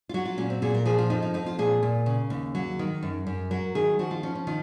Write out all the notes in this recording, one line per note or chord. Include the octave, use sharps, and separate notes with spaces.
F4
F#3 F#4
F4
A#2 C#4
C4
A#2 G#4
A#4
F3 G#4
F4
F2 D#4
D#4
F2 D#4
F4
A#2 G#4
A#2
C#3
D#2
F#3
D#3
F#2
F#2
F#3 A#4
D#3 G#4
F3 F#4
F4
F3 C#4
C#4
D#3 F4